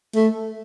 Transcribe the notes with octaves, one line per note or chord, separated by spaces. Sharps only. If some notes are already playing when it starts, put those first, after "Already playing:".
A3